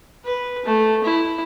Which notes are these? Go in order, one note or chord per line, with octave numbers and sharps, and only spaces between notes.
B4
A3
E4